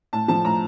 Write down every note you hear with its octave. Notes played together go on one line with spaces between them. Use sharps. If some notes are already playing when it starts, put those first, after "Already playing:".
A2 A5
F3 A5
A2 A#5